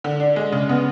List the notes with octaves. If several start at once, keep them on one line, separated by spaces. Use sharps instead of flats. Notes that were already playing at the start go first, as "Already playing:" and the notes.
D3
D4
G#3
C#3
B3